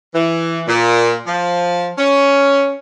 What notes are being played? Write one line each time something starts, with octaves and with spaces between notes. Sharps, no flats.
E3
A#2
F3
C#4